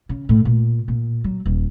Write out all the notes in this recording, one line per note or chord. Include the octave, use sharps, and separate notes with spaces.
C#3
A2
A#2
A#2
F#3
D#1